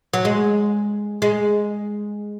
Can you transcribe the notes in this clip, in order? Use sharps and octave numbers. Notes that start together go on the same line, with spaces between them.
F#3
G#3
G#3